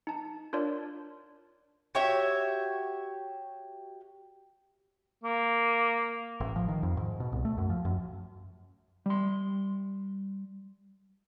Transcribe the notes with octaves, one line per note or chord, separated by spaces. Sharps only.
D#4 A5
D4 F4 A#4 C#5 D5
F#4 G4 C#5 E5
A#3
A1
F3
D#3
F2
G#2
B2
C2
A3
F#2
F3
F#2
G3 C6